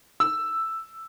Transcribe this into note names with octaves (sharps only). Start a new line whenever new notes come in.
E6